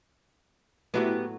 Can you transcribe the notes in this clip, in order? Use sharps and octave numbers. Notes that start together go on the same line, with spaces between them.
A2 F#3 A3 B3 E4 G4